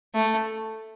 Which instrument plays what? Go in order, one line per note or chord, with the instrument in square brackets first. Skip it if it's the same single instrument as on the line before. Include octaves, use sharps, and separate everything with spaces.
[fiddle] A3